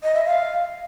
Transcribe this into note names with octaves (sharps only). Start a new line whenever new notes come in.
D#5
E5
F5